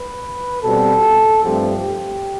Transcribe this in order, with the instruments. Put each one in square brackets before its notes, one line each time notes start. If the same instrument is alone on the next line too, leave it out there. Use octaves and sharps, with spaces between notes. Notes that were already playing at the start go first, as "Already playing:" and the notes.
Already playing: [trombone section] B4
B2 G3 C4 A4
G2 F3 A3 C4 G4
G4